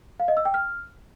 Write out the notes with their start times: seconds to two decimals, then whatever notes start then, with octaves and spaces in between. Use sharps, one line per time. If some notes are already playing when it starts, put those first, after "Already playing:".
0.20 F5
0.28 D#5
0.37 E6
0.45 G5
0.54 F6